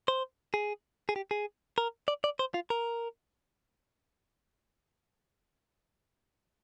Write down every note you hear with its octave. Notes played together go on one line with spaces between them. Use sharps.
C5
G#4
G#4
G4
G#4
A#4
D5
D5
C5
F4
A#4